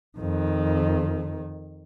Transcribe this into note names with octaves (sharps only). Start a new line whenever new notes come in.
F2 D#3